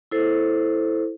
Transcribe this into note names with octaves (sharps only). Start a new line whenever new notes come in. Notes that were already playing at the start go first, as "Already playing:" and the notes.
E4 A4 C5